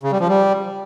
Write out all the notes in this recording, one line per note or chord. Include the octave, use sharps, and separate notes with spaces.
C#3
G3
F3
G3